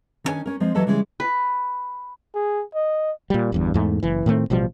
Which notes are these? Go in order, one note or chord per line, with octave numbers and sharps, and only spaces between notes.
D#3 B3 C#4 D4 C#5 G#5
C#4 A#4
F3 G#3 C4
E3 F#3 G4 A4 B4 D#5
C#3 E3 G3 G#3 C#4
B4
G#4
D#5
A#2 G3
G1 E2 G2
E2 G#2 A3
F#1 E3
A2 D#3 A3 C4
A1 B2 F3 G3